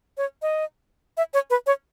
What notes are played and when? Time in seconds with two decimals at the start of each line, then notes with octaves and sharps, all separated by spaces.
0.17 C#5
0.42 D#5
1.17 E5
1.34 C#5
1.50 B4
1.67 C#5